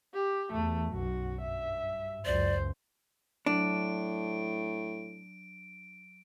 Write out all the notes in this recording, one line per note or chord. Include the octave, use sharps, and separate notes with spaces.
G4
E2 A3
B1 F#2 F#4
G2 E5
C#2 F#2 C5 D5
A2 F#3 D4 D7